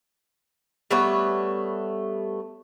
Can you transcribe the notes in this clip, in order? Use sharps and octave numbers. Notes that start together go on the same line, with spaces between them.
G3 A3 B3 C#5